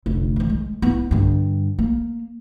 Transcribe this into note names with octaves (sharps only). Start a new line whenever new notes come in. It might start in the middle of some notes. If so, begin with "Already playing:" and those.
F1 D3
D#3 E3
G#3
B3 E4
G2 D3
A#3